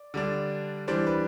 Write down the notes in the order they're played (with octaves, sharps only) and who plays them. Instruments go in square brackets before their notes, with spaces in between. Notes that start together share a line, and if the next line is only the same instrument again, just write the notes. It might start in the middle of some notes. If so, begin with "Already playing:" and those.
Already playing: [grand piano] D5
D3 G3 D4
E3 G3 D4 C5
B4